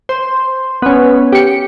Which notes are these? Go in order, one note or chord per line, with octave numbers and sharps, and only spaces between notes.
C5
B3 C#4
G4 C#7